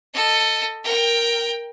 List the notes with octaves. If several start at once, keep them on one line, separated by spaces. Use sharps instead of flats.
A4 D#5
A#4 G5